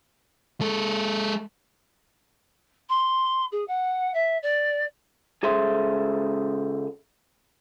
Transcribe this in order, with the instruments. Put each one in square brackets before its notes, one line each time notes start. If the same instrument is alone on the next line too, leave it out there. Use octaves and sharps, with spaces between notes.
[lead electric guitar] G#3 A4
[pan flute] C6
G#4
F#5
E5
D5
[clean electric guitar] C#2 G#4 A4 C5 E5 C6